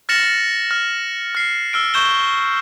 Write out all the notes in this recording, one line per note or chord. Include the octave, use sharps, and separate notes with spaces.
F6 A6 A#6 C#7 E7 F#7
F6
F6 C7
E6 F6 D7
C#6 G6 E7 G7